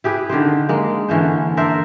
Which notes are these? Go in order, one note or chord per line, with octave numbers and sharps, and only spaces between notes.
E4 G4 G#4 B4
D3 D#3 G4 C5
G#3 A#3
D3 E3 C#4 C5
D4 A#4 C5 E5